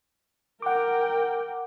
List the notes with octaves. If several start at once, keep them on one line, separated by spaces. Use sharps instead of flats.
A#4 F#5 G5 D6